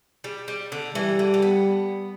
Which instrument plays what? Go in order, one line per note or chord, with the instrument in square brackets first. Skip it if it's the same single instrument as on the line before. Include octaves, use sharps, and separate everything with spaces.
[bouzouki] G3
G3
D3
[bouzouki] E3 [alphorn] G3
[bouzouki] D3
A3
B3